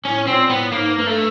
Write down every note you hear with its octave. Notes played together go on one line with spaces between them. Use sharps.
A2 C#4
A#2 C4
A2 B3
G#2 A#3
G2 A#3
A3